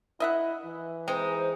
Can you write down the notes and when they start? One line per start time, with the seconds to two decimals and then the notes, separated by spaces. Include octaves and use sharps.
0.20 E4 D#5 E5 F#5
0.65 E3
1.08 G#3 C4 D#4 C5